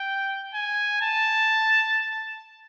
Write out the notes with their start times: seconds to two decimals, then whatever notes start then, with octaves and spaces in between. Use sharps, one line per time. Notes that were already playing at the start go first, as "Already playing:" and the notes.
Already playing: G5
0.54 G#5
1.02 A5